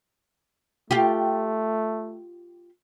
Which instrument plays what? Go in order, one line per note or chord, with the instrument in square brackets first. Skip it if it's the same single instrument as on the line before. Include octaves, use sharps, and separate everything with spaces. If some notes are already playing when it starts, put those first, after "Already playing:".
[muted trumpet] A3 [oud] F4 G4